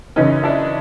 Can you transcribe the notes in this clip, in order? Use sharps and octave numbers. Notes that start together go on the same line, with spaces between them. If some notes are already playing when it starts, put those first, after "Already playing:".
F#2 C#3 E3 C#4 D#4
D4 E4